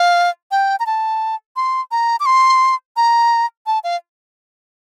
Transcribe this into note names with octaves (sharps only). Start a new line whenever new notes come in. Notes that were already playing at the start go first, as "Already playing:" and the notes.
Already playing: F5
G5
A#5
A5
C6
A#5
D6
C6
A#5
A5
F5